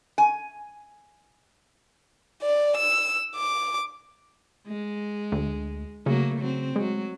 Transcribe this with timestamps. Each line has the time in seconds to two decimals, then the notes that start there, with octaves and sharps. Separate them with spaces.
0.18 G#5
2.42 D5
2.76 E6
3.34 D6
4.67 G#3
5.32 D2
6.06 C#3 F#3 A3 A#3
6.39 F#3 C4
6.76 F#3 G#3